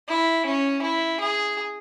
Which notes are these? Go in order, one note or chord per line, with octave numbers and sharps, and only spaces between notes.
E4
C#4
E4
G#4